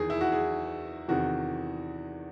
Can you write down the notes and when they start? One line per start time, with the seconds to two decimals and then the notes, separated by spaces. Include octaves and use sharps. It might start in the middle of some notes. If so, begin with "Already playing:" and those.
Already playing: E2 D#3 G#4
0.10 E4
0.21 F#4
0.32 G#4
1.08 E2 C3 D#3 F#4